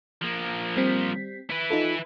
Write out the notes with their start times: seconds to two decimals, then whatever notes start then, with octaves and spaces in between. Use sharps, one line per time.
0.22 F3 A#3
0.77 G3 C4 B6
1.50 E4 B4
1.70 D#4 F4 A4